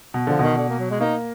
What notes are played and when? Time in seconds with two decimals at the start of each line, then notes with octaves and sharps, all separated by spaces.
0.14 B2
0.27 D3 F3
0.39 B2 D#3
0.57 D3
0.69 A#3
0.79 F#3
0.90 G#3
1.00 A#3 D#4